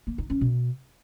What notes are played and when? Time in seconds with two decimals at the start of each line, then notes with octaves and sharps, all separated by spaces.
0.07 A#3
0.18 D#4
0.30 C#4
0.41 B2